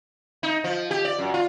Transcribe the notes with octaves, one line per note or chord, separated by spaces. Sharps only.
D#4
F3
G4
D5
F#2
F4